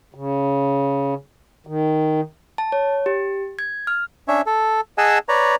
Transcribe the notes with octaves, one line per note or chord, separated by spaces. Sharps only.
C#3
D#3
A5
C#5
G4
G#6
F6
C#4 D4 C#5 E5
A4
G#4 D#5 F#5 G#5 A5 E6
B4 C#5 D5 A#5